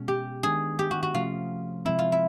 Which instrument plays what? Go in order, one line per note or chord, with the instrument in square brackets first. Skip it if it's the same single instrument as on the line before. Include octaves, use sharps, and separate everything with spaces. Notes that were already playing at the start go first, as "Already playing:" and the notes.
Already playing: [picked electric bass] B2 G#3 C#4
[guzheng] G4
[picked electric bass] D#3 G#3 B3 D4 [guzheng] G#4
[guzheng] G4
F#4
F#4
[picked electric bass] C3 F3 A3 C#4 [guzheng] F4
[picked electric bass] C3 F3 G#3 C4 [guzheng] E4
[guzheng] F4
E4